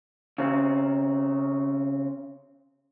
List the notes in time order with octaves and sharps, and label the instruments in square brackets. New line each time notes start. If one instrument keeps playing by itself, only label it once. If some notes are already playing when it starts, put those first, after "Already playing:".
[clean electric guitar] C#3 C4